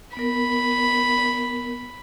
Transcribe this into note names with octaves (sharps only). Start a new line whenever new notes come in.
B3 A#4 B5